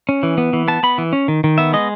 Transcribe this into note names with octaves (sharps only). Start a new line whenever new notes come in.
C#4
E3
B3
E3
B3 A5
B3 B5
E3
C#4
D#3
D#3
B3 E5
G#3 D#5